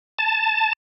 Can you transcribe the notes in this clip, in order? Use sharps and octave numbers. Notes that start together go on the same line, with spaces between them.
A5